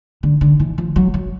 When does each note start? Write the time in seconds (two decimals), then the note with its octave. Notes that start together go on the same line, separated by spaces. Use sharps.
0.23 D3
0.41 D3
0.60 E3
0.78 F3
0.96 F#3
1.14 F#3